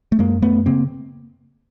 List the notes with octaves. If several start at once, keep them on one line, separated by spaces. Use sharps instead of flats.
A3
F#2 G#3 A#3
F#2 A3 B3
C#3 A#3 C4